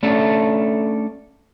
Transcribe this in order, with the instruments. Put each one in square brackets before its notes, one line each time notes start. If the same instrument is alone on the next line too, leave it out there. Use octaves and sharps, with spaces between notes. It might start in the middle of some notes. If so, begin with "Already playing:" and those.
[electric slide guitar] A3 C#4 D4 A4